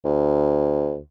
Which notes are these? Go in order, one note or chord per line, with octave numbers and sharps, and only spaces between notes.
D2